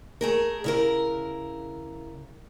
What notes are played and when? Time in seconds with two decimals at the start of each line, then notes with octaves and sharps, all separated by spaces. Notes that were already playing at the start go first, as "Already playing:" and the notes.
0.21 A3 G#4 A#4
0.64 C#3 E4 A#4